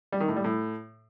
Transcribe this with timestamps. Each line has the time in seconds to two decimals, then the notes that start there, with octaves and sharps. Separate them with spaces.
0.12 G3
0.20 D#3
0.28 A2
0.36 G3
0.44 A2